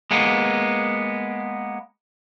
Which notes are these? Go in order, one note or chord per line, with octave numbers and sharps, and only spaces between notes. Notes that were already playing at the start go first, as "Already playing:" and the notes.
G#3 A#3 B3